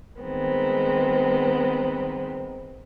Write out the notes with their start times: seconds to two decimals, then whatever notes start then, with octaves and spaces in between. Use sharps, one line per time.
0.21 D#3 G3 G#3 B3 C4